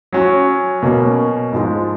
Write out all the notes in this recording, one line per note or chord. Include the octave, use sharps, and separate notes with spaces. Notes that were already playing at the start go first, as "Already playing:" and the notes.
F#3 C#4 F#4
B2 A#3 C#4
G#2 F3 G#3